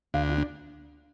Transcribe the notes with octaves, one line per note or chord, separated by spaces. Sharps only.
D2 F5
F4
D4